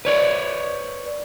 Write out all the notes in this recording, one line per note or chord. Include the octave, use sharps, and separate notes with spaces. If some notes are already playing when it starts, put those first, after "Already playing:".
B4 C#5 D5